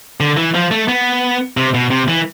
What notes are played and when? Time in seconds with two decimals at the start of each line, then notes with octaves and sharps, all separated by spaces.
0.20 D3
0.37 E3
0.55 F3
0.71 A3
0.88 B3
1.57 C3
1.74 B2
1.91 C3
2.08 E3